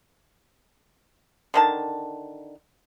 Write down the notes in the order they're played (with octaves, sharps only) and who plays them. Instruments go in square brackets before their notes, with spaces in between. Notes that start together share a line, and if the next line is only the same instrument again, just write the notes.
[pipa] D3 D#3 A5